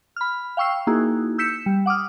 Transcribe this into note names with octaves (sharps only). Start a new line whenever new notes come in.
B5 F6
F5 G5 C#6 E6 C7
A#3 D#4 E4 F#4 G#4
E6 G6 B6 C#7 E7
G3
F#5 D6 D#6 F6